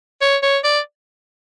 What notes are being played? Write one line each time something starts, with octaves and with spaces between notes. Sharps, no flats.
C#5
C#5
D5